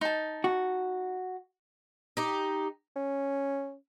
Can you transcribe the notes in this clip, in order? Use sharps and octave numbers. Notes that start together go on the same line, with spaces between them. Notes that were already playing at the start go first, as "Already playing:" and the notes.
D#4 A5
F#4
D#4 G4
C#4